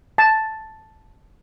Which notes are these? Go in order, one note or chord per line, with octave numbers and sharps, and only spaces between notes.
A5